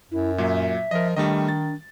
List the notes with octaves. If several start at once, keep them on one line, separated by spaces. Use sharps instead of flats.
F#2 E4
A#2 F#3 E5
F3 A#4 D#5
D#3 G3 A3 D4 D#5
A6